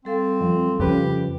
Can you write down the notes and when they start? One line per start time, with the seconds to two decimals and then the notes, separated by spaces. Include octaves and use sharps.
0.05 G3 C4 A4 F5
0.41 F2
0.80 F2 C#3 G4 B4